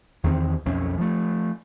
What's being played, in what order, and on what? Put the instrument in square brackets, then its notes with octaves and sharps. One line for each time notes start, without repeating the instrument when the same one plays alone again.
[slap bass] E2 D#3 B3 C4
B1 F2 C#4
F3 A3